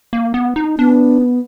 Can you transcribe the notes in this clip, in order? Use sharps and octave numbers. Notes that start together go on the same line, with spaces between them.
A#3
B3
D#4
B3 D4